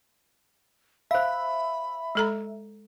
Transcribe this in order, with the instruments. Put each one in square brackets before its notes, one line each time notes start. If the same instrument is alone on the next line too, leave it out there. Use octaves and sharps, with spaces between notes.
[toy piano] C5 F5 [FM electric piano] E5 [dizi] B5
[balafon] G#3 A4 A#5